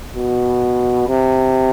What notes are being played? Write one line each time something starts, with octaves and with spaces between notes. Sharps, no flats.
B2
C3